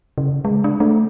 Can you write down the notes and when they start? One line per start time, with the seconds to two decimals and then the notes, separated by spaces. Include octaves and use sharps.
0.18 C#3
0.45 G#3
0.64 D4
0.80 A3